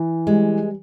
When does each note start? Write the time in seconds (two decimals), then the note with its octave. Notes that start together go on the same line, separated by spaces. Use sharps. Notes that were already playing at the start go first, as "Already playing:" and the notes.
Already playing: E3
0.27 G3 G#3